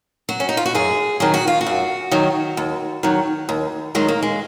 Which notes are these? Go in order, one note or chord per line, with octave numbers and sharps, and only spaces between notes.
F#3 F#4
C#4
D#4
F4
F#4
F#2 G#4
D#3 F#3 G#4
F#4
F4
F#4
F#2
D#3 F#3
D#2
D#3 F#3
D#2
D#3 F#3 G#3
A#3
G#3